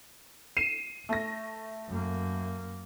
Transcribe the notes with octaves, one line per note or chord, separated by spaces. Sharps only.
C7 D#7 E7
A3 A#6
F#2 A#3